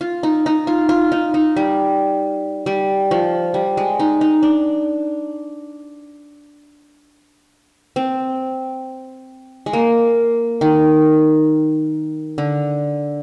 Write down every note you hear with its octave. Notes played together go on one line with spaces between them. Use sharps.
F4
D#4
D#4
F4
F4
D#4
D#4
G3
G3
F3
G3
G#3
D#4
D#4
D4
C4
G#3
A#3
D#3
D3